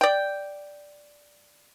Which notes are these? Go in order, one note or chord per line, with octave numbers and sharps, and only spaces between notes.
D5 G5